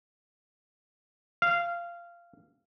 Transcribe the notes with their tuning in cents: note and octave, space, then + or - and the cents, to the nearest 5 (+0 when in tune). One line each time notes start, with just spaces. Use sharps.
F5 -15